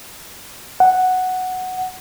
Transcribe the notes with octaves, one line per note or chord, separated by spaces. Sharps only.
F#5